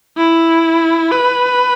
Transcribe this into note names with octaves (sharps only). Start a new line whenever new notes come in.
E4
B4